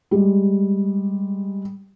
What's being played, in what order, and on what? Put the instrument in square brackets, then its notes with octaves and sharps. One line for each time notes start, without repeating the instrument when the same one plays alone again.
[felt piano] G3 G#3